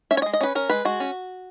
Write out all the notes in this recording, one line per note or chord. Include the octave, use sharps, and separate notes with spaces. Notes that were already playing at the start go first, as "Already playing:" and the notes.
C#4 E5
C#5
D#5
G#3
D#5
C#4 B4
C#4 A#4
G#3 B4
G#3 F#4
C#4